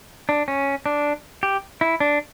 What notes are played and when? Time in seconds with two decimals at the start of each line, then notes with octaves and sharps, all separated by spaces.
0.29 D4
0.48 C#4
0.86 D4
1.43 G4
1.81 E4
2.00 D4